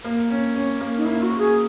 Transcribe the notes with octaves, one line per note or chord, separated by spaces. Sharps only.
A#3
C#4
C#4
A#3
D#4
A#3 E4
F#4
A#3
G#4